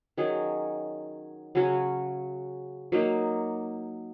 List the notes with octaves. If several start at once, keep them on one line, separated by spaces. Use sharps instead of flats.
D#3 F#3 C#4 G#4
C#3 F#3 C#4 F#4
F#3 A#3 D#4